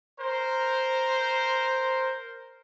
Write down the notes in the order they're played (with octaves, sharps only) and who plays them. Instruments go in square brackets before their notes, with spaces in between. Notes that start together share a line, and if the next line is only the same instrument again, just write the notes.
[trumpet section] A#4 C5